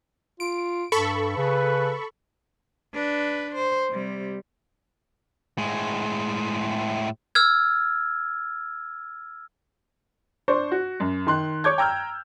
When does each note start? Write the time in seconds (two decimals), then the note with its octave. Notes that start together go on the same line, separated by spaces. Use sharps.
0.40 F4 D7
0.92 G2 A4 B5 C#6
1.37 C#3 B4
2.93 D4 B4
3.55 C5
3.91 C3 G3
5.58 A2 G#3
7.35 E6 F6 G#6
10.48 D4 C5 C#6
10.72 F#4
11.00 F#2
11.27 D#3 C6 F#6
11.64 C#5 C#6 D6 G6 G#6
11.78 G5 A#5 E6 F6 G6